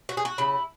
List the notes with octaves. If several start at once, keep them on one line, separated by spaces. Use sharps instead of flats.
F#4
G#4
F#4
C#3 E4